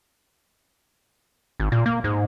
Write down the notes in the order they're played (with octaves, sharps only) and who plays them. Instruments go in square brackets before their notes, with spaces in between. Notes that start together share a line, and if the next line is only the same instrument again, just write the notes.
[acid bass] G#1
A#2
A#3
G#2